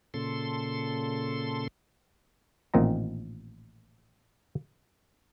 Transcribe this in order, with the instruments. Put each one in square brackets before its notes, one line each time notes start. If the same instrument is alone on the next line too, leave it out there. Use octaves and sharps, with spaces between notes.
[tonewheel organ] A#2 C#3 A4 C6
[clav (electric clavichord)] A1 A#2 D#3 C4 D#5 A#5